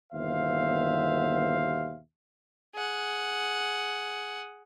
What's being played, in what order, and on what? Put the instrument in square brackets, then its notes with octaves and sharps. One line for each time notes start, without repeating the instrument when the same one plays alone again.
[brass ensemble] G1 D#2 B2 C5 E5 F5
[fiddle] G#4 F#5